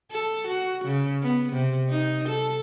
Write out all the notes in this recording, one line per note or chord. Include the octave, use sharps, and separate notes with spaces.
A4
F#4
C#3
B3
C3
D#4
A4